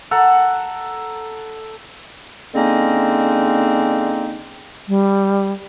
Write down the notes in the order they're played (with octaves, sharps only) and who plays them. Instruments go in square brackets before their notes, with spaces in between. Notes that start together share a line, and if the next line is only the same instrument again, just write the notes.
[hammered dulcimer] A4 F#5 A#5
[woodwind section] D3 G#3 A#3 C4 C#4 D#4
[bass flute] G3